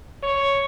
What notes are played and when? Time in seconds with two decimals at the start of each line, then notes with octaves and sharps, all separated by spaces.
0.24 C#5